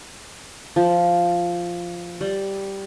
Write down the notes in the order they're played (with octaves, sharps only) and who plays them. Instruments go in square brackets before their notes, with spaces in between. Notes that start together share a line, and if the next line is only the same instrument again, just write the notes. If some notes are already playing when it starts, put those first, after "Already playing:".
[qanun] F3
G3